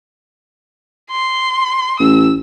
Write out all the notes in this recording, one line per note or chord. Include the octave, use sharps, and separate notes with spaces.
C6
A1 E6